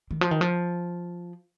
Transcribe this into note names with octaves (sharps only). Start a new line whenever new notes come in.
D#3
F3
D#3
F3